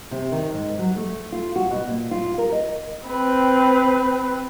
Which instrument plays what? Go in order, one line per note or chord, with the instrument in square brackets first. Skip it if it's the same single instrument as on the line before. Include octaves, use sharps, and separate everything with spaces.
[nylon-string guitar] C3
D#3
G#2
F#3
A3
F4
F#4
B2
A#2
F4
A#4
D#5
[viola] C4 B4